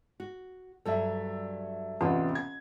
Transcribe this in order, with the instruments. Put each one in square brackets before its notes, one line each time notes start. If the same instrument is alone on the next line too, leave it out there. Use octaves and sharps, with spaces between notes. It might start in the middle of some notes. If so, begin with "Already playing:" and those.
[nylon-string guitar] F#4
[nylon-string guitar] G2 F#3 G3 [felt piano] A4 E5
[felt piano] A1 F4 [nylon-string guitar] E2 C3
[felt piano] G#6